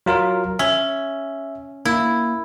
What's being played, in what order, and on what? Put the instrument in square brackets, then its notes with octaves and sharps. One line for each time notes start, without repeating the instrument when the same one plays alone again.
[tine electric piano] F#3 F4 A#4
[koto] C#4 [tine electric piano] E5
[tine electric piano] A#3 [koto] E4